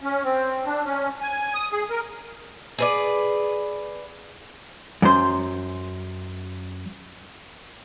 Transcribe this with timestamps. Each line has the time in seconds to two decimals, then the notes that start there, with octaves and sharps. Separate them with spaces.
0.01 C#4
0.24 C4
0.66 D4
0.84 C#4
1.21 G#5
1.54 D#6
1.72 G#4
1.90 A#4
2.78 G#4 B4 D5
5.02 F#2 C5